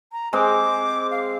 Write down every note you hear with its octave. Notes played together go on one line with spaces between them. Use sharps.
A#5
G#3 C4 C5 D6
F5